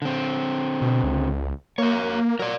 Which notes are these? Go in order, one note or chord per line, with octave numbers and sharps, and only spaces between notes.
D3 C4
B2
C#2
A#3 A#4 C#5
F#3 A#4 D5